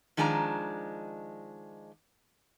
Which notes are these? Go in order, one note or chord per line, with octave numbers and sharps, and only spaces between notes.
D#3 F3 G#3 D4 F#5 A#5